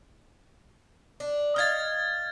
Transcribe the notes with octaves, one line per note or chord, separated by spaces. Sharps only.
D4
D#4 F5 F6 G#6 A6